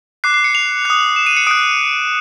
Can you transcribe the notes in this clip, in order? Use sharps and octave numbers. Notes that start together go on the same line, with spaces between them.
D6 F#6 C7
C7
C#7
F7
D#6 F#6
E7
D#7
C#7
D#6 F#6 D7